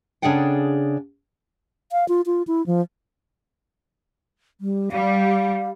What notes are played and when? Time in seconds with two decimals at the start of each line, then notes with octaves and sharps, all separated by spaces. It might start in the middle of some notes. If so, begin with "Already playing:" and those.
0.22 C#3 D4 G#4 A4 F#5 G5
1.92 F5
2.09 F4
2.26 F4
2.47 E4
2.67 F3
4.61 G3
4.92 G3 F5